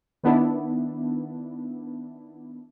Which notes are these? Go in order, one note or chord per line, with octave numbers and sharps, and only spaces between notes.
D#3 B3 D4 E4